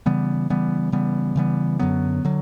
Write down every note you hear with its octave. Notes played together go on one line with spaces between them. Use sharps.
C#3 E3 G3 B3
C#3 E3 G3 B3
C#3 E3 G3 B3
C#3 E3 G3 B3
F#2 D3 F#3 B3
D3 F#3